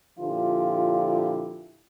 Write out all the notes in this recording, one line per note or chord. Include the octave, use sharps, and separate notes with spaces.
A#2 D3 F3 E4 F4 G4